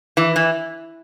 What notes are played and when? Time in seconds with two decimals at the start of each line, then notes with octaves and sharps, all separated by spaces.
0.17 E3
0.36 E3